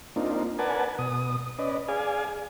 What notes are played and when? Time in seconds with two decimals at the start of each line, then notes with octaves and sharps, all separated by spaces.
0.16 A#3 C4 D4 D#4 F4
0.59 A#4 B4 D5 F#5 G#5 A5
0.98 B2 D#6
1.59 C#4 B4 D5 D#5
1.88 G#4 D5 F5 G#5